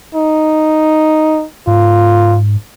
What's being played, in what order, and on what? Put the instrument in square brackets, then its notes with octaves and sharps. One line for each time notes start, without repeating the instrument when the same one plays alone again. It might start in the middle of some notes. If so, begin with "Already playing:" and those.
[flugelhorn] D#4
[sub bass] G#2 [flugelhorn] F4